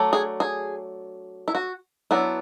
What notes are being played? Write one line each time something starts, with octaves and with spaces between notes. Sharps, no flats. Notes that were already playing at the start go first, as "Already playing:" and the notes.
Already playing: F#3 A3 D4
G#4
G#4
E4
F#4
F#3 B3 D4 E4